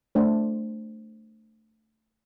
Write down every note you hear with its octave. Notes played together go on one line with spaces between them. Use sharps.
A3 D4 C5